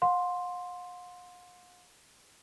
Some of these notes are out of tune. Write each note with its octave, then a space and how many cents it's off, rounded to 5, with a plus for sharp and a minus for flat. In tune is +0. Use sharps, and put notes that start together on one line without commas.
F5 +45 C6 +0